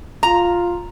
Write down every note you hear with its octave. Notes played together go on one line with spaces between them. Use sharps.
F4 A#5